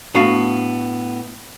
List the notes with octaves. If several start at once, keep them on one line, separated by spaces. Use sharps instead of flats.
A2 B3 D4 F#4 F5 A5